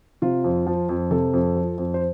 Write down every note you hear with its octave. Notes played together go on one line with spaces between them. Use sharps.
C3 F4
F2
F3
F2
C3 A4
F2
F3
F2
C5